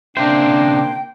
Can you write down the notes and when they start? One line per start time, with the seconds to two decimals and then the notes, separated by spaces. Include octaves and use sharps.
0.17 C#3 A#3 C4 D4 C5 E5 G5